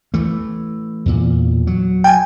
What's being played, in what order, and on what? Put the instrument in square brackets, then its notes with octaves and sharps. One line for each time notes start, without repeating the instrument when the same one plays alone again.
[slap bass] E3 A3
E2 A#2
F#3
[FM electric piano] G5 G#5